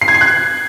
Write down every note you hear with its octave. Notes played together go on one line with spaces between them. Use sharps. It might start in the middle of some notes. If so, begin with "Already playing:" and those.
C7
G#6
C7
F#6